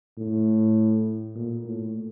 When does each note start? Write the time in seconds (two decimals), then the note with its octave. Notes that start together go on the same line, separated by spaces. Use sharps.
0.18 A2
1.35 A#2
1.65 A2